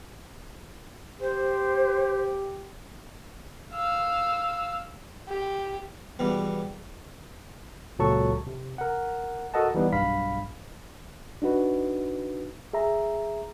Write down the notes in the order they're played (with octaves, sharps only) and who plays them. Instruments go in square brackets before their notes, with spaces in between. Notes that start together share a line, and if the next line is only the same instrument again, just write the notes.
[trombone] G4 [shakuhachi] C5
[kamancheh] F5 E6
G4
[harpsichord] E2 B2 G3
[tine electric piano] C#2 A#2 F#3 A4 A5 C#6
C3
A#4 F#5
F#4 A4 A#4 D#5 F#5 A5
E3 G3 B3 D#4
B1 G2 F5 B5 B6
[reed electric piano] D4 D#4 F#4 B4
G#4 E5 A#5